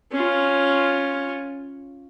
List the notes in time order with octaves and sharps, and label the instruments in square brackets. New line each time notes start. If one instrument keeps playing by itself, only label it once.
[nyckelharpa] C#4 F4